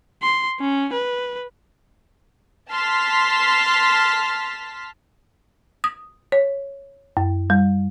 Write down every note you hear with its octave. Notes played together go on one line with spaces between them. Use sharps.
C6
C#4
B4
A5 C6 F6 B6
D#6
C#5
F#2
G3